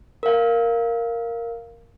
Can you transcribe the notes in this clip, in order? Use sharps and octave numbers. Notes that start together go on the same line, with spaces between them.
A#4 F5